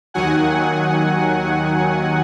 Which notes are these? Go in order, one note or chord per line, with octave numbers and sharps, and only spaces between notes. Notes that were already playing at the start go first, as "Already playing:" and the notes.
D#2 D#3 F#3 F#5 G#5